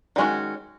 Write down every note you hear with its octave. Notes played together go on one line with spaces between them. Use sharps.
D#3 G#3 C#4 F#4